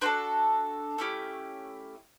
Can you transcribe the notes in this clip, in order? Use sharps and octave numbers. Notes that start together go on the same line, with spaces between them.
D4 F#4 A4 C5
A3 C#4 E4 G4